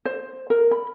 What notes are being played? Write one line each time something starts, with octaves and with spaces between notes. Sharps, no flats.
C5
A#4
B5